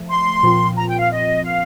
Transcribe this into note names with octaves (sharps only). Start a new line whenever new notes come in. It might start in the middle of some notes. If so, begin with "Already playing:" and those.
Already playing: F3 A3
C6
A#2 F3 C4 F4
A#5
G5
F5
D#5
F5